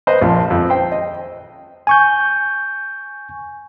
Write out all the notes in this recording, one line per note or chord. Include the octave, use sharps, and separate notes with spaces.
B4 C5 D#5
A#1 F3
F2
C5 G5
D#5
G#5 C#6 G6